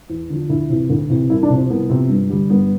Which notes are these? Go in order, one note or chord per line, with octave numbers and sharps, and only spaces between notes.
E2
D3 F3
D2 E4
C3 E3
D2
C3 E3
C2 E4
D4
C3 F3
C4
C2 B3
C3 F3
G2
D3 G3
G2 B3